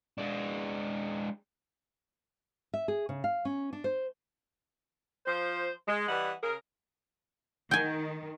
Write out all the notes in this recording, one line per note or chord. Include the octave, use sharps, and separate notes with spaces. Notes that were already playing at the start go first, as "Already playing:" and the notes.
G#3 D4
E5
G#4
C#3
F5
C#4
D4
C5
F3 C5
G#3
E3 G3 B4 D#5 F#5
C#3 G#4 A#4
D#3 G5 G#5